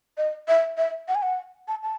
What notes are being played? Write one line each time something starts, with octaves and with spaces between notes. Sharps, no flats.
D#5
E5
E5
F#5
G#5
F#5
A5
A5